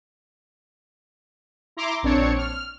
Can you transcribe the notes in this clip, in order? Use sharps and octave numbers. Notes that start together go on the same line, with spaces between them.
E4 A#5 C6 D6
A#1 C4 D4 C#5 C#7
F6